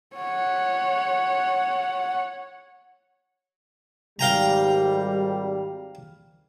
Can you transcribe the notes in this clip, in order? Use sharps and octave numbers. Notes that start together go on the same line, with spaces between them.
C#5 F#5
G#1 G3 F5 G5 A#5